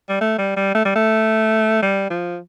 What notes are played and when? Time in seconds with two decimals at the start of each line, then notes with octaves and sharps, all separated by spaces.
0.09 G3
0.21 A3
0.38 G3
0.56 G3
0.75 A3
0.85 G3
0.96 A3
1.82 G3
2.10 F3